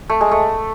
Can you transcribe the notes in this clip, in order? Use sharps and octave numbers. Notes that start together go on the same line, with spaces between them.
A3
G#3
A3